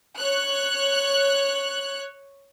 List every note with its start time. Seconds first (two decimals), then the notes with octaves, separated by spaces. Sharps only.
0.19 C#5 F#6